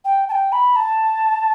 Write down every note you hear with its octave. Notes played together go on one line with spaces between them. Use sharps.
G5
A5
G5
B5
A5